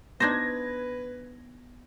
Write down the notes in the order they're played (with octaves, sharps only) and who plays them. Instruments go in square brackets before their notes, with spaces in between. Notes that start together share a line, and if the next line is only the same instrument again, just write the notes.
[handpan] B3 [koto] D4 D#4 C5 [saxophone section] B4 [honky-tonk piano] G#6 A#6